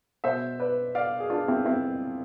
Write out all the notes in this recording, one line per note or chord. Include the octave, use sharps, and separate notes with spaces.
B2 C5 E5
B4 D5
D5 F5
G#4
D4 F4
C4 E4
C4 E4